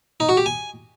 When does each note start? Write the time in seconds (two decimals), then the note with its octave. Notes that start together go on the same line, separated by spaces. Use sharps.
0.20 D#4
0.29 F#4
0.37 G4
0.46 G#5